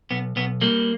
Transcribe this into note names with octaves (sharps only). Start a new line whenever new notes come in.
B1 B3
B1 B3
G3 A#3